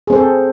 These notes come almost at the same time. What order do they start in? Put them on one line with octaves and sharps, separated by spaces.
G#4 C4 C5 A4